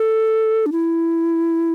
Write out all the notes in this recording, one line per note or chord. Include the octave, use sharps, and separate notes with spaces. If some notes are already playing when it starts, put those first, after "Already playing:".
Already playing: A4
D4
E4